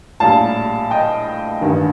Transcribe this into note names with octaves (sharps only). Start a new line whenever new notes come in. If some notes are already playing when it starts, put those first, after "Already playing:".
A#1 A2 G3 F5 A5
D#5 G5
A1 G2 D#3